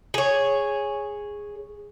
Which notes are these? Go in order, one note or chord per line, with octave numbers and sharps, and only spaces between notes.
G#4 C#5